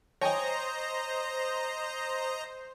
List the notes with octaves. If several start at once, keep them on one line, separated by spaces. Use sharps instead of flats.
C5 C#5 D#5 G5 G#5 A#5